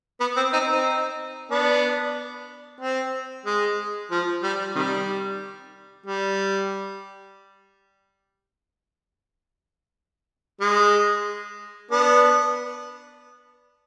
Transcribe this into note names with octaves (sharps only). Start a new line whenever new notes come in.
B3
C4
C4 D#4
C4 D#4
B3 D4
C4
G#3
F3
G3
C3 D#3 G3
G3
G#3
B3 D4